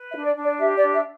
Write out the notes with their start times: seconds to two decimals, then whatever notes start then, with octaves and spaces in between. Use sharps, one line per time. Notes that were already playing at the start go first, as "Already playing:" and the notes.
Already playing: B4
0.08 E5
0.14 D4
0.25 D5
0.36 D4
0.43 D5
0.59 G4 E5
0.77 D5
0.81 D4
0.93 E5